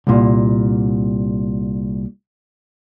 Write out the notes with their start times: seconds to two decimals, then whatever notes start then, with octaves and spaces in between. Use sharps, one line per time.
0.07 C2 A#2